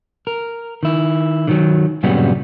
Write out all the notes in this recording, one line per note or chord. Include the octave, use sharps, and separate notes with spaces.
A#4
D#3 E4
D3 D#3 F#3
G2 A#2 C#3 F#3 G3 B3